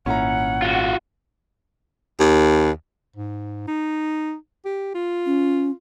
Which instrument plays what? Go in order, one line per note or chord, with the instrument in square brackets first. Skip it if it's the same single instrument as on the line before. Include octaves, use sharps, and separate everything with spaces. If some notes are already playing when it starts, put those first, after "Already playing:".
[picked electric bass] G#1 A#2 [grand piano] C#4 E4 A#5 [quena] F#5
[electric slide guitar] F4 F#4
[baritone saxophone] D#2
[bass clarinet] G#2
D#4
G4
F4
[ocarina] C#4